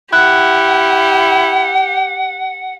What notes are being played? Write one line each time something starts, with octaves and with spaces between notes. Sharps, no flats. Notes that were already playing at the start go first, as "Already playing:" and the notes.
E4 G4 F#5 F#6